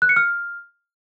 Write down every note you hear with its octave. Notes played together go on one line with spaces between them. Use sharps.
F#6
C#7
F6